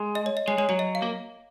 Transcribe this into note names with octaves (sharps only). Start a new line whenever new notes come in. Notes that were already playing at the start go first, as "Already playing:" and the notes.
Already playing: G#3
D#5
C#5
D#5
G#3 C#5
G#3 C#5
F#3 C#5
D#5
F5
A#3